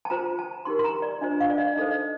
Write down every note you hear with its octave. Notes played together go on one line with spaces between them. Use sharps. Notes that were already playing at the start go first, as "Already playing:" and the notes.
A5
F4 C5 A#5
A5
D#4 G4 A#4 C6
C6
A#5
D5
D4 F4 C5 D#5
F5
D5
D#5
D#4 A4 C5 D#5
D#5